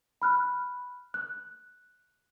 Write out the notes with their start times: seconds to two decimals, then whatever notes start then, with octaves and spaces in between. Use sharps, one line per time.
0.22 B5 F6 F#6
1.14 F#6